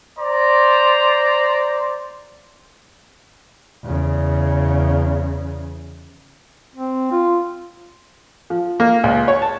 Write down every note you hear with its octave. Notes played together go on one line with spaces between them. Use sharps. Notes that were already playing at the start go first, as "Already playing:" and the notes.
C5 D5 A#5
E2 C#3
C4
F4
F3
A#3
C#2
C#5
A5